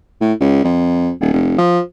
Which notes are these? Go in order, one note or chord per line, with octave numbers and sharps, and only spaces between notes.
A2
C#2
F2
D#1
F1
F3